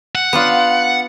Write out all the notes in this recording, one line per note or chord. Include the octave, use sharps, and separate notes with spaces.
F#5
B3 D4 F4